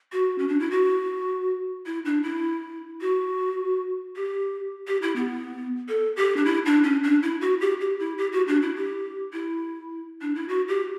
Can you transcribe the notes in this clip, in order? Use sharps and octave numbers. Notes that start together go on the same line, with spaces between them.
F#4
C#4
D4
E4
F#4
E4
D4
E4
F#4
G4
G4
E4
B3
A4
G4
D4
E4
D4
C#4
D4
E4
F#4
G4
G4
E4
G4
F#4
D4
E4
G4
E4
D4
E4
F#4
G4